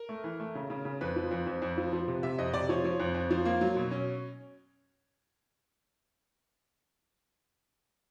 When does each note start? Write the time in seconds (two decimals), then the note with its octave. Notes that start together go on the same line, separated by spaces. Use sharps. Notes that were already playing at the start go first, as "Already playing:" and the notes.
Already playing: A#4
0.09 A3
0.24 E3
0.40 A3
0.55 C#3
0.70 C#3
0.85 C#3
1.01 F2 B4
1.16 F3
1.31 F2
1.47 F2
1.62 F2
1.78 F3
1.93 F3
2.08 C3
2.23 C3 E5
2.38 F2 D#5
2.53 C3 D5
2.69 F3 C#5
2.84 F3 C#5
3.00 F2
3.15 F2
3.31 F3
3.45 A#3
3.61 F#3
3.76 B2
3.91 C#4